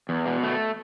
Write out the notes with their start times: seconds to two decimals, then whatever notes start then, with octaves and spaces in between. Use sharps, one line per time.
0.09 E2
0.26 B2
0.43 A3